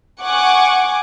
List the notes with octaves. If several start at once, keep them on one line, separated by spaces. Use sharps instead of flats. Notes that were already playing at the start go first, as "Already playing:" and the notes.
F#5 G#5 C#6 D6